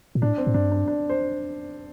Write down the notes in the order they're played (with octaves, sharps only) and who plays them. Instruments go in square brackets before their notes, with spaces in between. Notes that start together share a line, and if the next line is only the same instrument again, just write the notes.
[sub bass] A#2
[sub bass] A2 [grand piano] D4
[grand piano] C4
[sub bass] A2
[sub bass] G2 [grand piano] D4
[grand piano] D4
D4
C5